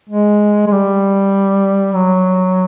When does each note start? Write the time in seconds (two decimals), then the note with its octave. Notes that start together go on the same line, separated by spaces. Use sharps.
0.10 G#3
0.67 G#3
0.72 G3
1.95 F#3